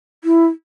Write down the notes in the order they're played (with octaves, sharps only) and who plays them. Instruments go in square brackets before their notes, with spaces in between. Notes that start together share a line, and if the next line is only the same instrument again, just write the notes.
[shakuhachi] E4